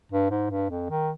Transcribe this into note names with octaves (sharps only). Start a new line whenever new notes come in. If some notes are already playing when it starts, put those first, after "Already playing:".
G2
G#2
G2
F2
D#3